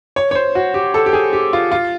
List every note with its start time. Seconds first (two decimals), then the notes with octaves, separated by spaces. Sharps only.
0.16 C#5
0.31 C#5
0.35 C5
0.55 F#4
0.74 G4
0.94 A4
1.06 G4
1.13 G#4
1.33 G4
1.53 F4
1.72 F4